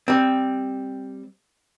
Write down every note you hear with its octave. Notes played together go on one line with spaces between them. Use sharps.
G3 C4